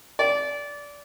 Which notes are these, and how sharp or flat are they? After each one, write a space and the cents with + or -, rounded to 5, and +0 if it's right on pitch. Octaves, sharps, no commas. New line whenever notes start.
D5 -20